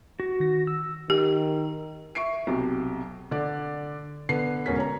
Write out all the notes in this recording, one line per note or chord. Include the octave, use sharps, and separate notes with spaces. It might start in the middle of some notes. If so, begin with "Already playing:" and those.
F#4
D#3 A#6
E6
D#3 G4
E5 C#6 C7 D7
B1 C3
D3 D5
D3 B3 C7
E1 G#2 C#4 A#4 B6
C#5 A#5